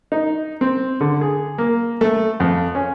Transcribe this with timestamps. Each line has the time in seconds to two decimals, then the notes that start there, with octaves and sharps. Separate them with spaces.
0.12 D#4
0.61 C4
1.01 D3
1.21 G#4
1.58 A#3
2.01 A3
2.40 F2
2.75 C#4